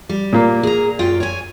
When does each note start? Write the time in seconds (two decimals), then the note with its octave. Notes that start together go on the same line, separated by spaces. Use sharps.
0.09 G3
0.33 A#2 A#3
0.63 G#4 A#5
0.99 F#2 F4 G5
1.20 C#5 G#5